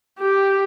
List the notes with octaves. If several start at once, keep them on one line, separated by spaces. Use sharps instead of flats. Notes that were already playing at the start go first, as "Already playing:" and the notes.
G4